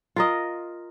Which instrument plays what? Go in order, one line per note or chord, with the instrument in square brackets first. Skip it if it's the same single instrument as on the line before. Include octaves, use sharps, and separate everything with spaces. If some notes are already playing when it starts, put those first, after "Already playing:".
[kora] F4 A#4 D#5